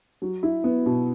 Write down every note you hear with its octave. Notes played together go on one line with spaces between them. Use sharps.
F#3
E4
B3
B2